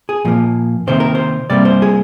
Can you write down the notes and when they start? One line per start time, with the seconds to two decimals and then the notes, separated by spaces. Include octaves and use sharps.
0.09 G#4
0.25 A#2 F3 A#3
0.87 C3 D#3 A#3 C5
1.00 A#4
1.15 C5
1.50 C3 G3 A#3 D5
1.65 C5
1.82 G#4